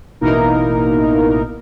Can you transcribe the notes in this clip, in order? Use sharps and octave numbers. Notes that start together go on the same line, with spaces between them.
A1 B2 A#3 D#4 E4 A#4